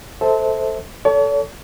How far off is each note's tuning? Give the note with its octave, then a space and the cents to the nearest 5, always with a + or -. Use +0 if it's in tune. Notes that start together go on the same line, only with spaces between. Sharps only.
A4 +0 C5 +0 E5 -30
A4 +0 C#5 +45